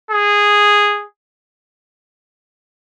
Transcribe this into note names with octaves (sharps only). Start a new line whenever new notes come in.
G#4